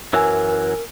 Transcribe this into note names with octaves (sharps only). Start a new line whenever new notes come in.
F#2 E3 F#3 A#4 G#5 E6